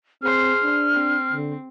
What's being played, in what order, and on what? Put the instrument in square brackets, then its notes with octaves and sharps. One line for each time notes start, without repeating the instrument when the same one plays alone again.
[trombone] C4 [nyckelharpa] G#4 C5 [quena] F6
[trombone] D4
[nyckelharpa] C4
[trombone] D3